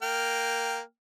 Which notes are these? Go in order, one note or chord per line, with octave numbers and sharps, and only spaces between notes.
A#3 G5 F6